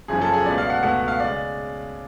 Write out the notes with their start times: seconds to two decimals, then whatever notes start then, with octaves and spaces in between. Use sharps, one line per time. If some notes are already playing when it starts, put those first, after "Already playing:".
0.08 F#1 F#2 C#3 F3 G#4
0.22 A4
0.33 G#4
0.45 C#2 B2 A3 D5
0.58 F5
0.70 F#5
0.82 C#2 B2 A3 F#5
0.96 F#5
1.08 F5
1.20 C#3 G#3 D5